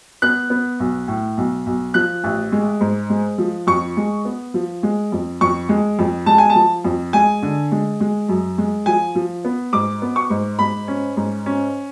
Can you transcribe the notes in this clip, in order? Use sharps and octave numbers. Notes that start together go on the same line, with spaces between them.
B3 F#6
B3
B1
A2
B1
B1
F3 F#6
A1
G#3
G#2
G#3
F3
F2 C#6
G#3
B3
F3
G#3
F2
F2 C#6
G#3
F2
G#3 A5
G#5
A5
F3
F2
G#3 G#5
D3
G#3
G#3
F#2
G#3
F3 G#5
F3
B3
G#2 D6
B3
C#6
G#2
G#2 B5
C#4
G#2
C#4